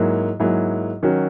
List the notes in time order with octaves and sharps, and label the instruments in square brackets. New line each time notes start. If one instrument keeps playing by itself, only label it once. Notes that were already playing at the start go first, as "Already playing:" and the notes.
Already playing: [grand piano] G#2 F#3 A#3 E4 G#4
G#2 F#3 A#3 E4 G#4
D#3 F#3 C#4 F#4